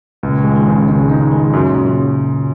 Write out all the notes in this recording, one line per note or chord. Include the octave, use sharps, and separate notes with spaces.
C#2 A#2
G#3
D#3
C#3
C#3 G#3
G#3 D#4
D#3 G#3
F#2 C#3
A#2
F#2
C#3